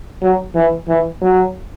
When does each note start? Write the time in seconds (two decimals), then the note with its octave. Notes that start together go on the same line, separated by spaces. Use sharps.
0.22 F#3
0.55 E3
0.89 E3
1.22 F#3